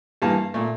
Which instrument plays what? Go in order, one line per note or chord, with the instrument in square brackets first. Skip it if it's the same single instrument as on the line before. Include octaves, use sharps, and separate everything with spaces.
[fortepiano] G2 E3 A#3 F5 A5
A#2 A3